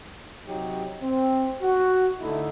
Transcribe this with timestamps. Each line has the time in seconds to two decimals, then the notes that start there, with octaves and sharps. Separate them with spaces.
0.47 C3 F#3 D#4 G4
1.02 C4
1.62 F#4
2.21 D3 A3 D#4 E4